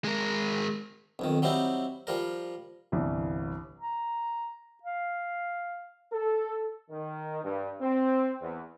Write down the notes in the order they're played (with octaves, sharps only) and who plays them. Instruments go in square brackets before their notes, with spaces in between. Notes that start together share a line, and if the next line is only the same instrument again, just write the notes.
[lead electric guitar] G#3 A#4
[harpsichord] B1 F2 D#3
F#3 G3 C4 D#4 E4
F3 G3 A#4
[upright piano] G1 C2 E3
[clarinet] A#5
F5
[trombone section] A4
D#3
G2
C4
E2